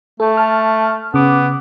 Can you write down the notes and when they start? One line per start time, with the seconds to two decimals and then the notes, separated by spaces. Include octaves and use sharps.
0.20 A3 A4
0.37 A5 F6
1.14 C#3 B3 D6